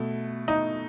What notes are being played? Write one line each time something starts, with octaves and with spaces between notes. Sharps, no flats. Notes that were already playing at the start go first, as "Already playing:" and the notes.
Already playing: B2 A3
D#4